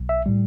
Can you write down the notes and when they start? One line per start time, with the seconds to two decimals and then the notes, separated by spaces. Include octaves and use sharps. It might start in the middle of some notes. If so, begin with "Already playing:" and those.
Already playing: B1
0.09 E5
0.26 A2 G3